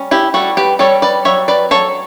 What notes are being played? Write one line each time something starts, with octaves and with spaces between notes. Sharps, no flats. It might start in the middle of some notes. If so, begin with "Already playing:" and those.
Already playing: G3 C#4
E4 G4
G3 F#4 A4
G4 B4
G3 A4 C#5
B4 D5
F#3 C#5 E5
B4 D5
F#3 A4 C#5